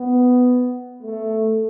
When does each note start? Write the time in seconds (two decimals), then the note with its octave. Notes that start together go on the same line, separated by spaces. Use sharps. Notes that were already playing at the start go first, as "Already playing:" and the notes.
Already playing: B3
1.03 A3